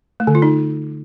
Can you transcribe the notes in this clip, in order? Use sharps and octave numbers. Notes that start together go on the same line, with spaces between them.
A3
D3
F4
D#4